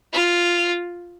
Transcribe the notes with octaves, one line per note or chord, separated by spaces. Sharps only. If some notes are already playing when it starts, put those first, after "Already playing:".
F4